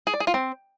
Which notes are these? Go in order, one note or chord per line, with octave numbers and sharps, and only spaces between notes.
G#4
D5
G#4
F4
C4